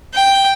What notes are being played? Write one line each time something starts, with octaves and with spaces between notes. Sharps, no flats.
G5